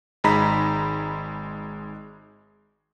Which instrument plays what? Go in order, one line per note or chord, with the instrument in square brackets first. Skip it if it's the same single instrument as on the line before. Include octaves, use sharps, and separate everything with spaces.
[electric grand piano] G#1 G#3 D#4 A#5 B5 B6